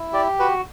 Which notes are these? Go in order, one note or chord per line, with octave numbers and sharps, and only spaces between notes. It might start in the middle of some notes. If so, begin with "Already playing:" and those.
Already playing: E4
G4 D5
F#4 B4